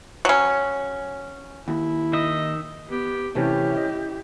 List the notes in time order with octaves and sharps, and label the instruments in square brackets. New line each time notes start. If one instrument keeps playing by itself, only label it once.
[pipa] F#3 C#4
[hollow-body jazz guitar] D#2 [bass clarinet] E4
[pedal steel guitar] D#3 D#4 E5 [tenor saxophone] D#5
[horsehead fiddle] B3 [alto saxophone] G4
[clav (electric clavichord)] C3 E3 A3 [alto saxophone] C#4 [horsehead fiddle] E4 G4
[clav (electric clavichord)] D#5